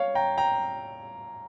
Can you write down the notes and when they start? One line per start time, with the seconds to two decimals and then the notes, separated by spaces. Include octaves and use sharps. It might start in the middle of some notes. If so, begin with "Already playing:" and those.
Already playing: C#5 F5
0.15 G5 A#5
0.38 G5 A#5